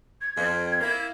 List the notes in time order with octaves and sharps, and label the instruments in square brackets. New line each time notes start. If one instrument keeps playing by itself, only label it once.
[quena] G#6
[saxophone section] F2 C4
A#3 E4